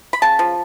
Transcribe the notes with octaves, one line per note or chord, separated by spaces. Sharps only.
B5
C#3 A5
F3